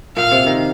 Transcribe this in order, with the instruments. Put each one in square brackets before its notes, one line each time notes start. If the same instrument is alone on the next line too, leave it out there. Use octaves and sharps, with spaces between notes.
[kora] A#2 [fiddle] F5
[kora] C3
D#3